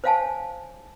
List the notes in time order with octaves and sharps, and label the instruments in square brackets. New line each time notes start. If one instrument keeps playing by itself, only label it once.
[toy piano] C5 C#5 F5 F#5 G#5 A5